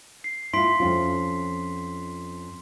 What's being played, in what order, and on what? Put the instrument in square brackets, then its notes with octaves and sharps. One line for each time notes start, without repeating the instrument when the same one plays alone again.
[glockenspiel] C7
[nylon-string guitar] E4 F4 [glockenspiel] C6 B6 D7
[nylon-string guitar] F2 C#4 F4